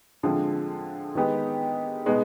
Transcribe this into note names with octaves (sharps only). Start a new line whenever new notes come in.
D3 F3 G#3 C4
D#3 G#3 B3 D#4 G4
B2 G#3 B3 D#4